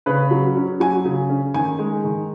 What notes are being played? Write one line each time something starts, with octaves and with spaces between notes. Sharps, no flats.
C#3 B4
F#3
C#4
F#3 G#5
C#3
C#4
D#3 G#5
G#3
D#3